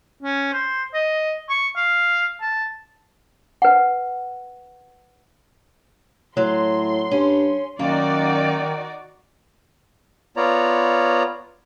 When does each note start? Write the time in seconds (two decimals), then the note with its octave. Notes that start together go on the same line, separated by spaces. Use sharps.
0.23 C#4
0.53 C5
0.94 D#5
1.50 C#6
1.77 F5
2.41 A5
3.62 B4 F#5
6.37 A2 F#3 C6
7.11 G2 C#4
7.79 F#2 D#3 A#3 D#4 F#4 D5
10.37 B3 F4 C#5 D5 A#5